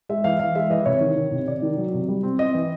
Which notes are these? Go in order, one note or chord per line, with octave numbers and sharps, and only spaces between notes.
G#3 E5
E3 F5
E3 F5
G#3 E5
E3 D#5
C3 C#5
D#3
D#3
C3
C3 D5
D#3
F#3
C3
G3
C4
C4 D#5
E3